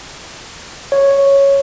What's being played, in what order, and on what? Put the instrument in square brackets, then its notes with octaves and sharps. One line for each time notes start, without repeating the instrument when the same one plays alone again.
[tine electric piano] C#5